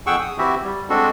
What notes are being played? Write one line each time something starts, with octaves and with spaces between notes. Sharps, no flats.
F2 G#4 F#5 G5 C#6 E6
D#6
E3 C4 E4 F#4 G4 E5
G3
G#3 C4 D4 F#4 A4